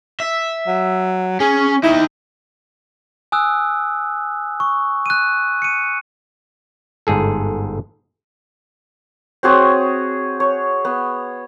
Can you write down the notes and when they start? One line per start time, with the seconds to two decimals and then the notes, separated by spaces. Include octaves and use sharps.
0.20 E5
0.67 F#3
1.40 C#4 G#4
1.84 D#4 E4 G4
3.32 G#5 D#6 E6 F#6
4.60 C#6
5.06 F#6 D#7
5.62 C#7 D#7
7.07 G1 G#2 G#4 A4
9.43 C4 F#4 G#4 C#5
10.40 C#5
10.85 B3